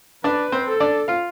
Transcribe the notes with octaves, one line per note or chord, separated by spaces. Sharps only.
D4 B4 D5
C4 C5
A4
D4 D5
F4 F5